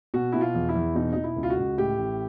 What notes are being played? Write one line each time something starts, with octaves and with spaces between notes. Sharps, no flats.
B2 F#4
B2 E4
F4
E2
E4
E2
B2 D#4
B2 D#4
E4
C#2
F4
F#4
C#2
A2 G4
A1